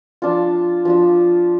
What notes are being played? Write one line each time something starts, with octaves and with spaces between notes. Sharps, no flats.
F3 D4 F4
F3 D4 F4